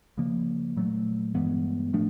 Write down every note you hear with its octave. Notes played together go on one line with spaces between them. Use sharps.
C#3 F3 A#3
A#2 F#3 A3
G2 E3 G#3 B3
A2 F3 A3 D4